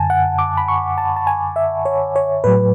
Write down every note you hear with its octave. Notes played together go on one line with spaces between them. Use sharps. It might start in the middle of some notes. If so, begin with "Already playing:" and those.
Already playing: F#2 D3 G#5 A5
F#5
D6
B5
C#6
A5
A5
G#5
E5
C#5
C#5
A2 F#3 B4